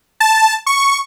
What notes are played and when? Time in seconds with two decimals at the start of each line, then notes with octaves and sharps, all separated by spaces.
0.20 A5
0.66 C#6